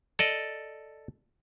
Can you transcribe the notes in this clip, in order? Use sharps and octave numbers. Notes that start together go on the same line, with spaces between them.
A4 D5 D#5